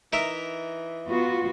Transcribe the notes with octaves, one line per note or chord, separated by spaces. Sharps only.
E3 D#4 A#4 E5
B3 F4 F#4